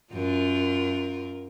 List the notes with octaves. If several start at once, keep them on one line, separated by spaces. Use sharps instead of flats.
F#2 F4 A#4